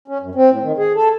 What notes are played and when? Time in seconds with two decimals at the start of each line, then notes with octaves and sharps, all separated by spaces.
0.08 C#4
0.21 F#2
0.35 C4
0.50 A2
0.62 D#3
0.77 G#4
0.95 A4